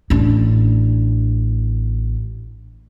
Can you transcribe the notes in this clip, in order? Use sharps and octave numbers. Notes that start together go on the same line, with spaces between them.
A1 D4